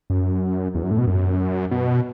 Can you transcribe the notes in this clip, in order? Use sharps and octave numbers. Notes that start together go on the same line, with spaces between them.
F#2
E2
F#2
A2
B2
F#2
B2